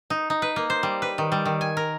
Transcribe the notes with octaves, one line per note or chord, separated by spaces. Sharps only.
D#4
D#4
B4
A#3
C5
G3
B4
D#3
G3
D#3
G#5
A#4